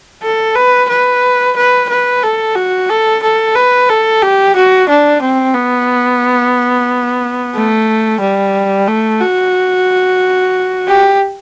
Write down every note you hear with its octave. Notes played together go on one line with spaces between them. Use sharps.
A4
B4
B4
B4
B4
A4
F#4
A4
A4
B4
A4
G4
F#4
D4
C4
B3
A3
G3
A3
F#4
G4